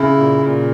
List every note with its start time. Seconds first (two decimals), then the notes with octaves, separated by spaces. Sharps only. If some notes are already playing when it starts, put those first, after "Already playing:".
Already playing: C#3 E4
0.17 A#2
0.41 A#2